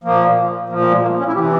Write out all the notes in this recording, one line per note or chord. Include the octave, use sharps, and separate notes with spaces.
A#2 F3 A#3
A#2 F3 A#3
A#3
G#3
A#3
C#4
E4
C3 E3 G4